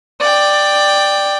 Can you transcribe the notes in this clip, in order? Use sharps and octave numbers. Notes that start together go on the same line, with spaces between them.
D5 G5